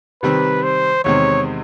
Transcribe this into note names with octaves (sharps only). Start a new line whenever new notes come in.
C3 D#3 G3 C4 B4
C5
E2 C3 D#3 G#3 C4 C#5